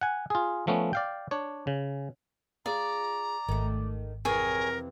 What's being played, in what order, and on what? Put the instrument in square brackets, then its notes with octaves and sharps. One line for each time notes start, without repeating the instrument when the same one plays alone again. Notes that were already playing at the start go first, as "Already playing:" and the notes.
[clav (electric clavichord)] F#5 G#5
F4 G#4
F3 A3 B3 C#4
D5 F5 G5
D4 C#5
C#3
[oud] F4 G#4 [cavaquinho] D5 [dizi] A#5
[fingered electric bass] G#1 [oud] D#3 A3
[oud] F2 C3 E3 [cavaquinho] G#4 C#5 [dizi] A#4